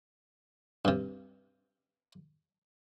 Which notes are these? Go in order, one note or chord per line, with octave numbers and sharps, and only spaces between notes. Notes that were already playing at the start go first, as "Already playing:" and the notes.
G2 C3